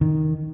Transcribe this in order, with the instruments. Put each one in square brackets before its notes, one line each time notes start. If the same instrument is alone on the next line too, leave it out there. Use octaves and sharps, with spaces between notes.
[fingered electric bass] D#3